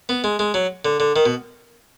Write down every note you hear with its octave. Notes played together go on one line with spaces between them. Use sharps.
B3
G#3
G#3
F#3
D3
D3
D#3
B2